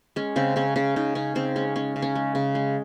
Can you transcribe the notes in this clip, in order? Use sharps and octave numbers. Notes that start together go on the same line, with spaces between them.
G#3 C#4
C#3 C4
C#3 C#4
C#3 C#4
C#3 D#4
C#3 C#4
C#3 C4
G#3 C#4
G#3 C#4
C#3
C#4
G#3
C#3
G#3